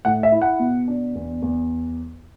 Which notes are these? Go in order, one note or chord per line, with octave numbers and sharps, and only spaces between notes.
A2 F#5
E5
E4
F#5
B2
D4
E2
E2